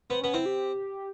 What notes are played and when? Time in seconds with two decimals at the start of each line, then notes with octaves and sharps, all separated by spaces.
0.10 B3 C4
0.21 B3 C#4
0.34 C4 E4
0.46 G4